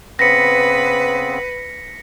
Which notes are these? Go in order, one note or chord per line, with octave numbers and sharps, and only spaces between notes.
C#3 B3 C4 B4 A#6 B6 C#7